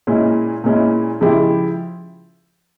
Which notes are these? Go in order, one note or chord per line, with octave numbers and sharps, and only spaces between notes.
A#2 G#3 C#4 E4
A#2 G#3 C#4 E4
C#3 F3 G#3 E4 G4